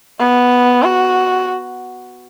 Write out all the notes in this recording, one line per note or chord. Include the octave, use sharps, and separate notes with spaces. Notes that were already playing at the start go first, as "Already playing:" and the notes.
B3
F#4